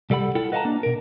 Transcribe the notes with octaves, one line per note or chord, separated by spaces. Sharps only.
C2 G3 A4 F#5 B5
E4 F4 A4 F#5 G5
B4 D#5 F5 F#5 A5 A#5
A#3 D4
B2 A#4